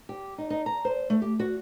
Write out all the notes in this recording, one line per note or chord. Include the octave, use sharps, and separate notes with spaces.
G4
D#4
D#4
A#5
C5
A3
G4
F#4